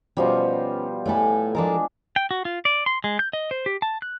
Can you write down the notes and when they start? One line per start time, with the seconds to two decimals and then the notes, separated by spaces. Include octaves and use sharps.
0.17 B2 F3 G3 C#4 F#4
1.06 A2 A3 A4 G#5 B5
1.55 F3 G#3 D4 A4 A#4
2.16 G5
2.31 F#4
2.45 F4
2.65 D5
2.86 C6
3.04 G#3
3.19 G6
3.33 D#5
3.51 C5
3.66 G4
3.82 A5
4.02 F#6